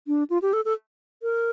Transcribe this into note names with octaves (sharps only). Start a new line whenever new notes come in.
D4
F4
G4
A4
A4
A#4